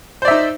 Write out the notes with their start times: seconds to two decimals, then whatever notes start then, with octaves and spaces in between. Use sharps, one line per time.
0.22 C5
0.25 D5
0.28 E5
0.31 D#4